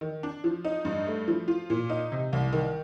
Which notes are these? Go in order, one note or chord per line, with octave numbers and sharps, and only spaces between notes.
D#3
D4
F3
D#4
G2
A3
F3
F4
A#2
D#4
C3
C2
D#3